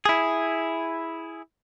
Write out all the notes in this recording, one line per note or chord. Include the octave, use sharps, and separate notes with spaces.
E4 G#4